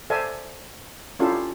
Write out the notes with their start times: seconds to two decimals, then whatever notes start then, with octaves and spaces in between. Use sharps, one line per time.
0.10 A4 C5 D5 E5 G#5
1.19 C#4 D4 E4 F4 G4 A4